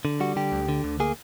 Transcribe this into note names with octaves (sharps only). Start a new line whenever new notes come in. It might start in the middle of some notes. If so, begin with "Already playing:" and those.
D3
G3 F#4
D3 G4
D2
D3
D2
A#3 G#4